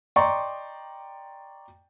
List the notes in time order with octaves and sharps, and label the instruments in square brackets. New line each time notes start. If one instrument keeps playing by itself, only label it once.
[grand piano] D5 D#5 G5 A#5 C6 C#6